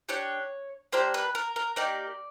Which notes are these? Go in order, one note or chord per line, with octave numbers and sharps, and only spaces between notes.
D4 G4 C#5
A#3 D4 G4 C5
B4
A#4
A#4
A#3 D#4 G4 D5